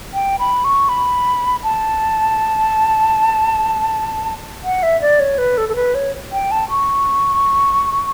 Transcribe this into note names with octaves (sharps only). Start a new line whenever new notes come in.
G5
B5
C#6
B5
A5
F#5
E5
D5
C#5
B4
A4
A4
B4
C#5
G5
A5
C#6